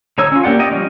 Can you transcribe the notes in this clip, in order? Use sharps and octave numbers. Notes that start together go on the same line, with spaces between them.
D3 D#4 C#5 E6
C#4 F4
A#3 G4 D5 F#5
G4 D5 D#5
F3 G3 C#4 D#4